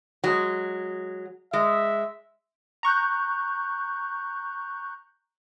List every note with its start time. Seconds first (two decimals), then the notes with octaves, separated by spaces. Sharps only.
0.24 F#3 G#3
1.53 G#3 E5
2.83 A#5 C#6 F#6 G6